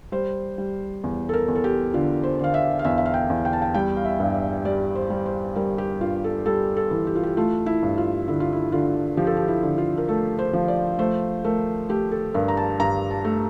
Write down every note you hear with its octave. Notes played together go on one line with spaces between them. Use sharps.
G3 C5
G3
E2
A4
A#4
E2
A4
G4
D3 F4
C5
D3 F5
E5
F5
E2 E5
E5
F5
G5
E2
G5
A5
G5
G3 G5
F5
E5
G2
E5
G3 D5
C5
G3
C5
G3 A#4
G4
G2 F4
A4
G3 A4
A4
E3
G4
F4
G4
A3 F4
E4
G2
F4
D3 E4
F4
E4
D3 F4
F3 G4
A4
G4
E4
D3
F4
A#4
A3 A4
C5
F3
D5
A3 C5
A3 A#4
A3 G4
A4
G2 A#4
A#5
A5
G2 A#5
A5
A3